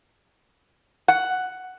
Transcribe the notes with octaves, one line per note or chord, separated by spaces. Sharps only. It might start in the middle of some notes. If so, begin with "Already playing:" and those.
F#5